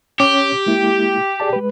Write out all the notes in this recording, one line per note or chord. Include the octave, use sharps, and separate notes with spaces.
C#4 G4 C#5 D6
G#3 A#3 E4
G#4 D5 A5
G#3 B4